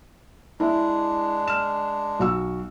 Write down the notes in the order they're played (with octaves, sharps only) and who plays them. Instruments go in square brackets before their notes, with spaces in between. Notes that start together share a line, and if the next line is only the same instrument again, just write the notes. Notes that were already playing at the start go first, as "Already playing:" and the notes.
[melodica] G#3 D4 [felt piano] E4
[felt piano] F6 E7
B1 F#4 E6